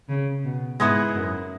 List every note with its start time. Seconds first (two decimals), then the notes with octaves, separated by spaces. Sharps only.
0.09 C#3
0.45 B2
0.80 G#2 G#3 B3 E4 G#4
1.15 F#2